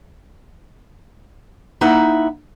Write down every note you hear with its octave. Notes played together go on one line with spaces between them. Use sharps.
A#3 D#4 E4 E5 F#5